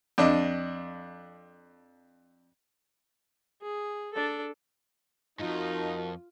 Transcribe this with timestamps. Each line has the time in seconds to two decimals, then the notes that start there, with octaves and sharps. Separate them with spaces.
0.18 F2 D4 D#5
3.62 G#4
4.14 D4 A4
5.39 F2 G#2 D#4 F4 F#4 A#4 A5